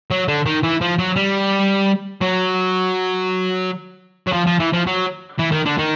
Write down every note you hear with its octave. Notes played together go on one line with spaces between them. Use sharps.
F#3
D3
D#3
E3
F3
F#3
G3
F#3
F#3
F3
F3
E3
F3
F#3
E3
D#3
D3
D#3